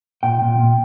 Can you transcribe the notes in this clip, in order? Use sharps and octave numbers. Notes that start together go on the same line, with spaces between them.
A#2 G5
A#2
A#2